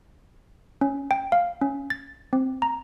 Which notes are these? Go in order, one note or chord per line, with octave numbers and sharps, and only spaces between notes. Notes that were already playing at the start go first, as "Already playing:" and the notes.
C#4
G5
F5
C#4
A6
C4
A#5